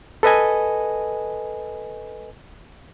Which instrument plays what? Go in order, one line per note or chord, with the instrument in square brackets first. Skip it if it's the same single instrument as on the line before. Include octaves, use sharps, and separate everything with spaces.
[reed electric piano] A4 B4 D#5 G#5